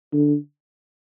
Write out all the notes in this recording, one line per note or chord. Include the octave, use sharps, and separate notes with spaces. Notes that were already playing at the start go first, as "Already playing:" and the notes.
D3